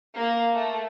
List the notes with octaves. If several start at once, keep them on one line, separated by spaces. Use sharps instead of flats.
A#3
A3